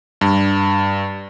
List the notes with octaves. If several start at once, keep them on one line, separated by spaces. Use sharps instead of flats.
G2